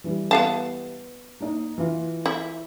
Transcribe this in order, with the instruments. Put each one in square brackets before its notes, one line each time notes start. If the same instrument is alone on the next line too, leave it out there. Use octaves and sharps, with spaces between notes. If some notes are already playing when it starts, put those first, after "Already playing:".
[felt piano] E3 G3
[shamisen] B3 F5 A5
[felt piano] A#3 D#4
E3 F4
[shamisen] E4